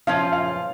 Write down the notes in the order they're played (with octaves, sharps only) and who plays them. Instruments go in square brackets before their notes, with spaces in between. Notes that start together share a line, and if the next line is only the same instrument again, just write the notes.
[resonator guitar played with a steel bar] F3 C#4 F4 [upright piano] F5
[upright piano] F5